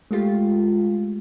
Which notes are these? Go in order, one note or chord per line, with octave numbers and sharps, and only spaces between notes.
G#3 A3 F4 G4